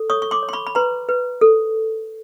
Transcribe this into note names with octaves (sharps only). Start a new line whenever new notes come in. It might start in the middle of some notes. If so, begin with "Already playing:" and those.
Already playing: A4
C#5 C#6 D#6
C#6
C6 D6
C#5
C6
B5 C#6
B5
B4 A#5 C6
B4
A4